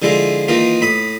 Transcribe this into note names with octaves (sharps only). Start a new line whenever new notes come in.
D3 F3 G#3 E4 F4
D#3 E3 A#3 F4
A2 B5 D#6